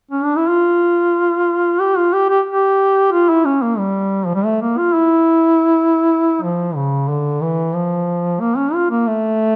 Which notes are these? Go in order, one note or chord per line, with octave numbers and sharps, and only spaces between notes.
C#4
D4
E4
F4
G4
F4
G4
G4
G4
F4
E4
C#4
A#3
G3
F3
G3
A3
A#3
F4
E4
F3
C#3
D3
E3
F3
A#3
C#4
F4
A#3
A3